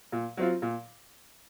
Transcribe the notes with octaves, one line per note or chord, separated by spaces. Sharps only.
A#2
F#3 C4 F4
A#2